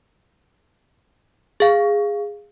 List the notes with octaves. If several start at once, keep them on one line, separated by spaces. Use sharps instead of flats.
G#4 F5